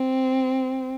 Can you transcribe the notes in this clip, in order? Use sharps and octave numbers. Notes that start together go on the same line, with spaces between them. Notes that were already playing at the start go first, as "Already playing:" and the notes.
Already playing: C4